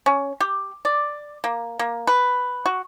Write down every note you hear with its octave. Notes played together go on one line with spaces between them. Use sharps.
C#4
G4
D5
A#3
A#3
B4
F#4